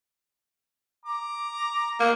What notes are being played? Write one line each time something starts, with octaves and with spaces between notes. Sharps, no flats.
A#5 D6
A#3